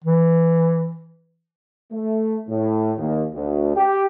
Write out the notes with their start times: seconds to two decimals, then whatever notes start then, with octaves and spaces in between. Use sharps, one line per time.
0.04 E3
1.92 A3
2.49 A2
2.98 D#2
3.34 D2
3.76 G4